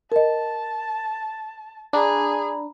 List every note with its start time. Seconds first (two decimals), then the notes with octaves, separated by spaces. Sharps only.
0.12 A#4 D#5 A5
1.93 D4 G#4 A#5 B5